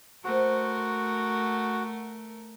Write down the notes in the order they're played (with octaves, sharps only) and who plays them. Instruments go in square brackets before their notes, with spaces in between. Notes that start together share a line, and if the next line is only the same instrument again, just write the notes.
[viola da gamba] A3 A#4 [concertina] F#4 [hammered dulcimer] C5